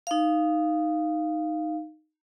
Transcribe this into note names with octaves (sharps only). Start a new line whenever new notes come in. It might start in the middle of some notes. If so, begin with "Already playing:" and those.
D#4 F5